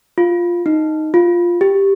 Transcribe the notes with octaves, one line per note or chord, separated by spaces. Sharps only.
F4
D#4
F4
G4